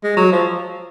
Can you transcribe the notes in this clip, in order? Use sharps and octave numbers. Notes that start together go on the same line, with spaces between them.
G#3
F#3
F3